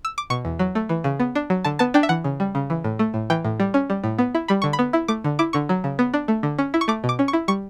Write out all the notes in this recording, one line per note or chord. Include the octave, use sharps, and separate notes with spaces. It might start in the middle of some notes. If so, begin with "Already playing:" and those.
E6
D6
B2 C#6
E2
F#3
A3
E3
C#3
B3
D4
F#3
D3 A5
B3 A5
D4 G5
E5
E3 F#5
C#3
G3
C#3
E3
A2
A3
A2
E3 G5
A2
G3
C#4
G3
A2
B3
E4
G3 B5
D3 C#6
B5
B3
E4
A3 D6
D3
E4 D6
D3 C#6
F#3
C#3
B3
D4
A3
D3
C#4
E4
C#6
A3 D6
B2
D6
C#4
C#6
E4
G3 C#6